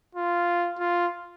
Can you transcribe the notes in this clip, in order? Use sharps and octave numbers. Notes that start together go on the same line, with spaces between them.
F4
F4